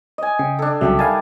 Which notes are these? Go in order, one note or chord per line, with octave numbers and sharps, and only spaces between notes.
D#5 G#5
C#3 G5
D4 A4
C2 C#3 F#3 E5 G5 A5
D#3 G3 F5 G#5 A5